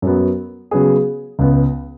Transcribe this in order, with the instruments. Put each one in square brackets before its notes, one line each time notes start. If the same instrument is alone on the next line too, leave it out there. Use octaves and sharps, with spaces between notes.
[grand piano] F#2 F#3 B3
C#3 F#3 B3 G#4
C#2 C#3 B3